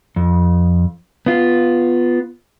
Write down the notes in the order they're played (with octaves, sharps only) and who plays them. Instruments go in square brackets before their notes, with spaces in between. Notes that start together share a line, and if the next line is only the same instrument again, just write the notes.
[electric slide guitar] F2
B3 F4